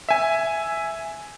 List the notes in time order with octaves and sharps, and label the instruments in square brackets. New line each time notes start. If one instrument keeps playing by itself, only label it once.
[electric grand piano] E5 G#5